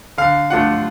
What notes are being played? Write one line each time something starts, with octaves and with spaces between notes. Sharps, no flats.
D3 F5
F3 A3 D4 F4 F#5